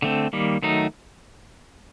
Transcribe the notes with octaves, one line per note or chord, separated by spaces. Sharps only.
D3 A3 C4
D#3 G3 A#3
D#3 F#3 A3 D#4